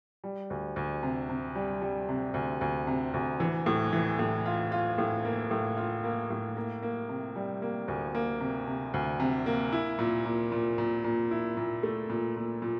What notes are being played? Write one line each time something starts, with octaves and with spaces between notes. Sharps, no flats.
G3
D2
D2
C3
C3
G3
G3
C3
D2
D2
C3
D2
E3
A2
E3
A2
F4
F4
A2
A#3
A2
F4
A#3
A2
A#3
A#3
C3
G3
A#3
D2
A#3
C3
C3
D2
C3
A#3
E4
A#2
A#2
A#2
A#2
A#2
E4
A#2
A3
A#2
A#2
A#2